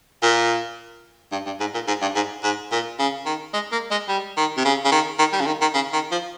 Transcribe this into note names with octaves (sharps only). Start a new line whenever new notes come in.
A#2
G2
G2
G#2
A#2
G#2
G2
G#2
G#2
A#2
C#3
D#3
G#3
A#3
G#3
G3
D#3
C3
C#3
C#3
D#3
D#3
G3
C#3
D#3
D#3
C#3
D#3
F3